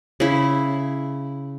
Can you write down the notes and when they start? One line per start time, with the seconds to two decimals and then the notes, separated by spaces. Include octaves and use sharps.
0.20 C#3 E4